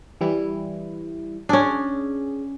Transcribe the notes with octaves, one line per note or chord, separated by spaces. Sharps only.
E3 G3 E4
C#4 D4 G#4